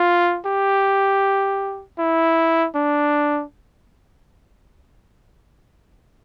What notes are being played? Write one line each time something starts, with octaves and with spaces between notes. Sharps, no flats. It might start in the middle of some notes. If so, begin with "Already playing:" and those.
Already playing: F4
G4
E4
D4